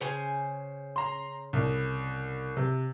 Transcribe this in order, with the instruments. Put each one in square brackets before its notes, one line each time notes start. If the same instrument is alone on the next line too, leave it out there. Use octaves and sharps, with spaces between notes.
[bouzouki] C#3 C5 G#5
[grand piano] A#5 C6
C2
C3